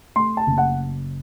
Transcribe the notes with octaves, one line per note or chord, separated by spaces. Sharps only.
A3 C6
A5
F#1
F#5